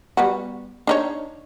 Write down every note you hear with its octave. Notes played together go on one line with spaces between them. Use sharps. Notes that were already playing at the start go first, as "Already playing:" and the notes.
G3 B3 F#4
D4 D#4 C#5